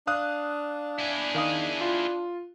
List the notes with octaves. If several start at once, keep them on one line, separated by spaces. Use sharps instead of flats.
D4 F5 D#6 F#6
E4 G#4
D#3 F5 D#6
F4